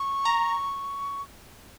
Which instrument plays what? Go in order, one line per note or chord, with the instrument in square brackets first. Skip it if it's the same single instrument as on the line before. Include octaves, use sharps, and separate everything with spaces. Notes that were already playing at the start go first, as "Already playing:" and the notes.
Already playing: [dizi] C#6
[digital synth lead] A#5